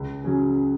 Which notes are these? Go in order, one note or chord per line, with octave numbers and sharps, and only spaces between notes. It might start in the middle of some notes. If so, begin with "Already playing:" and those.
Already playing: C#2
C#3 F#3 C#4 G#4